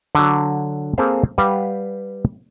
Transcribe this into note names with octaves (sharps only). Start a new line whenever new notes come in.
D3 F#3
A#3 C4 G#4 A4 C5 F5
G3 G4 B4 F5 F#5